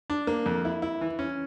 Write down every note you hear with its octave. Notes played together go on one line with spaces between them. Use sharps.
D4
A#3
F2
E4
E4
E3
C#4